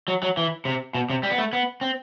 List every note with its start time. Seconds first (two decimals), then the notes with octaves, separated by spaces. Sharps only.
0.08 F#3
0.23 F#3
0.37 E3
0.65 C3
0.95 B2
1.10 C3
1.23 G3
1.31 B3
1.38 A3
1.53 B3
1.81 C4